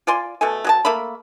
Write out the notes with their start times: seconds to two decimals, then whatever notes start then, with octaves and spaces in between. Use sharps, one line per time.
0.07 F4 D5 G#5 C6
0.41 B2 A3 A4 G#5
0.64 F#3 G#4 A5
0.85 A3 A#3 E5 B5